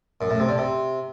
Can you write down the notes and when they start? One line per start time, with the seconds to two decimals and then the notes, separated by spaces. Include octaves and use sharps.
0.21 F#2
0.30 A2
0.39 C3
0.49 D3
0.58 C3